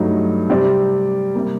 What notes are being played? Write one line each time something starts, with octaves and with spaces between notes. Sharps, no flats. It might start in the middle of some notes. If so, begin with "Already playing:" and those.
Already playing: G2 F#3 A3 D#4
C3 G3 C4 G4 D5
C3 G3 A#3